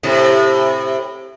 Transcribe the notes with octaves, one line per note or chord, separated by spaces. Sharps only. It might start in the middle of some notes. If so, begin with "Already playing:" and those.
A2 C3